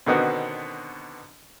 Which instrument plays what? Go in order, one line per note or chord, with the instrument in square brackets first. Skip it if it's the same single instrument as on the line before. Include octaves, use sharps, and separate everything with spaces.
[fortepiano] B2 D3 D#3 B3 C4 F#4